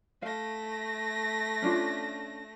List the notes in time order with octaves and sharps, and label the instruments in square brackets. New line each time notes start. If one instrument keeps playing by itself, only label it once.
[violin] A3 A#6 [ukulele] F5
[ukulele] C#4 D4 F4